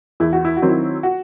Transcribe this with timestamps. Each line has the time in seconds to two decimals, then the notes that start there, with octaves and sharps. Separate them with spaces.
0.20 E2 E4
0.33 F#4
0.45 E4
0.57 F#4
0.62 D#3 F#3 C4
0.69 E4
1.03 F#4